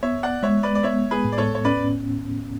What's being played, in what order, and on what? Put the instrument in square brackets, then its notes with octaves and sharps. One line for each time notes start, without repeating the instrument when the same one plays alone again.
[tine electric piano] B3 [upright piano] C#5 E5
[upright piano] D5 F#5
[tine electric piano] G#3 [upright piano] C#5 E5
[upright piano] B4 D5
D5
[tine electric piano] B3 [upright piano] C#5 E5
[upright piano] G#4 B4
[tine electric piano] A2
[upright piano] D5
A4 C#5
C#5
[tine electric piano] C#4 [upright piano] B4 D5